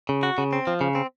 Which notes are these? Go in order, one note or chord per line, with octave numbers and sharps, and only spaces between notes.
C#3
F#4
C#3
C4
F3
C#3
C4